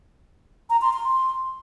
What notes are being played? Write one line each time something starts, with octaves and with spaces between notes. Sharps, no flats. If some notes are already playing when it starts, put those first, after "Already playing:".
A#5
C6
C6